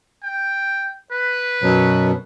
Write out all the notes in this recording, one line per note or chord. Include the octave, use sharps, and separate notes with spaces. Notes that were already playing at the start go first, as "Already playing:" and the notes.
G5
B4
F#2 B2 F#3